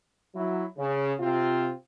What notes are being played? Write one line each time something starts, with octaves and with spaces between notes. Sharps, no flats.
F#3 E4
C#3
C3 C4 F4